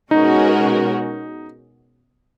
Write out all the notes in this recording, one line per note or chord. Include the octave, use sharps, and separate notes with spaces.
B2 G#3 C#4 D#4 F#4 A#4